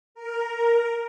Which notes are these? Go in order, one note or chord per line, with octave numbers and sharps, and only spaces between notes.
A#4